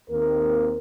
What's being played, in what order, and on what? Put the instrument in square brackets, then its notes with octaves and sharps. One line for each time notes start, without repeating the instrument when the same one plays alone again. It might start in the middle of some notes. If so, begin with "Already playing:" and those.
[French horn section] D#2 D#3 A#3 C4 A#4